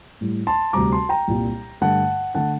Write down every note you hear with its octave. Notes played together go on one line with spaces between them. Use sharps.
A2 G3
A5 C6
D2 C3 G3 A#5 D6
A5 C6
G5 A#5
C2 A#2 G3
G2 D3 A3 F#5 A5
D3 A3 F#5 A5